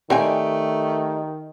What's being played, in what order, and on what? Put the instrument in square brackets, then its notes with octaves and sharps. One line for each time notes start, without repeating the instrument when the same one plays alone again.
[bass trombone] D#3 [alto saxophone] A3 [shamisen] C4 G5 G#5 [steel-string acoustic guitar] G4 D5